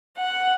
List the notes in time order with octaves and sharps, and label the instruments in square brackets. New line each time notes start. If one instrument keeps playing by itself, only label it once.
[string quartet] F#5